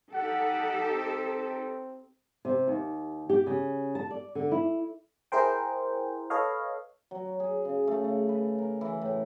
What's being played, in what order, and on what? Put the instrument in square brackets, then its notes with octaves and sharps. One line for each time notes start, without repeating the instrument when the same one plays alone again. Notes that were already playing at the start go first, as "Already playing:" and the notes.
[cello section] D#4 G4 A4 [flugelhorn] F#5
[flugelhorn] C4
[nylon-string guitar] C3
D#2
G4
C#3
A5
D5
D3
E4
[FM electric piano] E4 G#4 A#4 C5 G5
A4 B4 C#5 D#5 F5
[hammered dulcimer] F#3
G#4
C#3
A3
C#3
B4
A#4
E3
A2